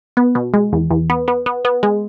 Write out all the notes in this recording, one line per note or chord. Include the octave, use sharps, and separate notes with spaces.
B3
B2
G#3
E2
E2
B3
B3
B3
B3
G#3